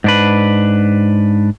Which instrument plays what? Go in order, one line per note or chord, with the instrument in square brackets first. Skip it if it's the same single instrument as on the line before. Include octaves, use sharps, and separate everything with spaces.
[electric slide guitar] G#2 D4 B4